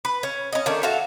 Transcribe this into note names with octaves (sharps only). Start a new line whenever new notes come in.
B4
C#4
C#4 D#5
D#3 A3 C#4 D4
F#4 A4 E5 F5